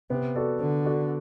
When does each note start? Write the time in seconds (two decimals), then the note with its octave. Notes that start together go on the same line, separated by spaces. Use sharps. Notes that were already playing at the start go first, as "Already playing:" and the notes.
0.10 C3 B3
0.36 F#4 A4 D5
0.60 D3 B3
0.85 F#4 A4 D5